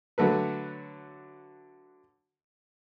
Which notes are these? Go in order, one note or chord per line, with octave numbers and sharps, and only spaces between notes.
D3 F#3 A3 B4